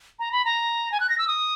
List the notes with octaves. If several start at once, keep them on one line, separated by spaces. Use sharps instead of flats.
A#5
B5
A#5
G#5
F#6
A#6
E6
D#6